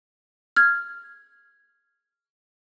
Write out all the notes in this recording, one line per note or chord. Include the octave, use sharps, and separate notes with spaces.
F6 G#6